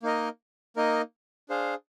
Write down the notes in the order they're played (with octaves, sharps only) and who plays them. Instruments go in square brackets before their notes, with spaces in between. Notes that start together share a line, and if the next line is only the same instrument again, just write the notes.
[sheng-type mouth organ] A#3 D#4 A#4 D#5
A#3 D#4 A#4 D#5
D4 G#4 C5 F5